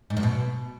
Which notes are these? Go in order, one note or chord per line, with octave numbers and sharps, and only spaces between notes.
G#2
F#2
B2